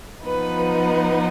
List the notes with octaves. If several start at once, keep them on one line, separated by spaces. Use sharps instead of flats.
F3 B3 D#4 B4
B4